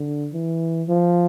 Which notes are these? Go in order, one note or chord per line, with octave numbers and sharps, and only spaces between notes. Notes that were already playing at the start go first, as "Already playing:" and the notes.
Already playing: D3
E3
F3